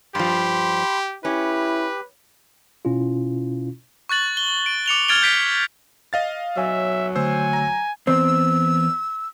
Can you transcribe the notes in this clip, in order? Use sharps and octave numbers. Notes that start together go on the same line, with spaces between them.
G2 F3 G4 B5 C6
C#4 E4 G4 B4
B2 C#4 E4 F4
C#6 F#6 A6 F#7
G7
D7
D6 C#7 F7 G7
F6 G#6 A6 D7 F7 G7
G6 B6 D7
D#5 F5 A6
F#3 C#5 E5 G#5
D3 A3 C5 G#5 E6
A#5
E2 C4 E6